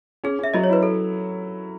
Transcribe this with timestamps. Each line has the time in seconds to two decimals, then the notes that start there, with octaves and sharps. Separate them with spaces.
0.24 C#4 G#4
0.39 C#4 E5
0.54 F#3 D#5
0.64 C#5
0.69 E4 B4
0.83 A4